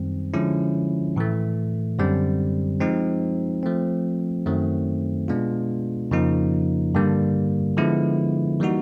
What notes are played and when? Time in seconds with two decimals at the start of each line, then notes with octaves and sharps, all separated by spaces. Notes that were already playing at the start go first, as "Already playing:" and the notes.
Already playing: F#2 D#3 G3 C4
0.34 D3 F3 G#3 C#4 E4
1.16 A2 E3 A3
1.99 F#2 D3 G3 C4
2.81 F3 G#3 C4 D#4
3.63 F3 A3 C4
4.46 F#2 D#3 F#3 A3 C4
5.28 B2 G#3 B3 D4 F4
6.11 F2 C#3 F3 A#3 D#4
6.95 G2 D3 G3 A#3
7.77 D3 F3 G#3 B3 E4
8.60 E3 G3 A#3 D#4 F#4